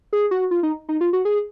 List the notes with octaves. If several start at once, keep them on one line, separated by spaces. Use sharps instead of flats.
G#4
F#4
F4
D#4
D#4
F4
F#4
G#4